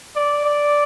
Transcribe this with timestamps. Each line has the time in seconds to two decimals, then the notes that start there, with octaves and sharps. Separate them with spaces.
0.16 D5
0.45 D5